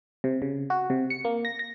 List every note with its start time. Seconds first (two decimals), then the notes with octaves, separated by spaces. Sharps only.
0.24 C3
0.42 C#3
0.70 F#4
0.90 C3
1.10 C#7
1.25 A#3
1.45 A#6
1.59 A#6